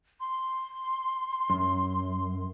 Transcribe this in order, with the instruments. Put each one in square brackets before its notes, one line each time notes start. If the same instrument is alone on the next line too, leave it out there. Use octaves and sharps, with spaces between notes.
[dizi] C6
[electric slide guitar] F#2